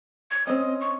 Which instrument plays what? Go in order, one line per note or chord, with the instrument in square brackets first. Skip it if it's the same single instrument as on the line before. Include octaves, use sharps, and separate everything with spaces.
[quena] G#6
[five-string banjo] C4 C#4 [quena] D#5
[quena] C#6